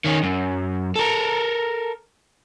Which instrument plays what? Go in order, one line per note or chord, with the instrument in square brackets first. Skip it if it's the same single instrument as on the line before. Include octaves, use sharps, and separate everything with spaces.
[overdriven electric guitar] D#3 C#4
F#2
A4 A#4